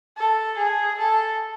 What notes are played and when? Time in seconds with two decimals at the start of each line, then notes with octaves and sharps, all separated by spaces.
0.17 A4
0.57 G#4
0.98 A4